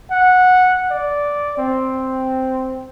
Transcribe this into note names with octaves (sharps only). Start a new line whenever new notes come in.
F#5
D5
C4